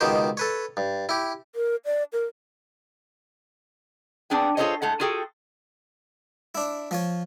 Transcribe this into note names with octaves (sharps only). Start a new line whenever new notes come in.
C#2 B2 D#3 G4 C5
A4 B4 C#5
G2
E4 G4
A#4
D5
A#4
B3 C4 D4 G#4 G5
F4 G#4 A4 C5 C#5 D#5
A2 G#3 A4 F#5
F4 F#4 G#4 A4 G5
D4 E4
F3 F4 C#5